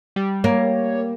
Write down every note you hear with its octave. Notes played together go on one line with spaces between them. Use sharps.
G3
A#3 C#5